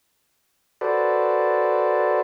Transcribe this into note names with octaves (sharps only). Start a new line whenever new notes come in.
F#4 A4 B4 C5 D5